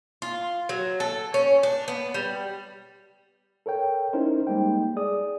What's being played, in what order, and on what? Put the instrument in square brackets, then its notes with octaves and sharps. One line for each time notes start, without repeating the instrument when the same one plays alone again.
[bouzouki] F4
F#3
A4
C#4
D4
B3
G3
[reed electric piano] A4 A#4 C#5 G5
C#4 D#4 E4 A#4 C5
G3 G#3 A#3 D#4 G5
G#4 D5 D#6